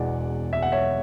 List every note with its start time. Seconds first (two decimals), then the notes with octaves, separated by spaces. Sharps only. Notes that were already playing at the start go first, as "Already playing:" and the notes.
Already playing: E1 E2 B2 D5 F#5
0.53 E5
0.62 F#5
0.72 C#5 E5